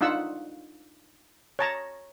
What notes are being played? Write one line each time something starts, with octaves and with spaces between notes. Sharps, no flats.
D4 D#4 F4 F#5 E6
C#5 A5 A#5